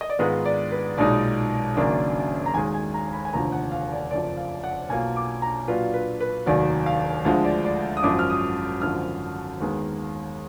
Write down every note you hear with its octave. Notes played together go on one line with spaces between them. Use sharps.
D#5
D5
G#2 D#3 G#3 B3 F4 B4
D5
B4
B1 A#2 G#3 D#4 D5
F#1 F#2 D#3 A#3 D4
A#5
D#2 D#3 G#3 G#5
G#5
A#5
B5
G#5
F1 D#2 D3 F3 A#5
F#5
F5
D5
F#1 F2 F3 D5
F5
F#5
B1 B2 A#3 F4 G#5
D6
A#5
A#2 F#3 D4 F4 B4
B4
B4
F1 D#2 D#3 F#3 D5
F5
D2 D3 F3 G#3 F5
D5
D5
D#6
G#1 F#2 F3 D6
F6
D#6
G#1 F#2 D3 F3 F6
D#2 D#3 G#3 B3